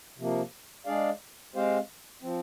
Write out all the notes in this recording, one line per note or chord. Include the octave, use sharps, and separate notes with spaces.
C3 F3 A#3
G#3 D4 G#4 D5 F5
G#3 C4 G4 C5 F5
F3 C4